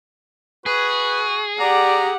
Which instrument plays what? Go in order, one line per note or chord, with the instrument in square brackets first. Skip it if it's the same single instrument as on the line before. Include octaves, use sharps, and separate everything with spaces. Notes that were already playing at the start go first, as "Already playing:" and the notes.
[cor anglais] F#4 [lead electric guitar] G#4 [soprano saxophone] B4
[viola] G4 F#5 [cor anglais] D5 [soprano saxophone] A#5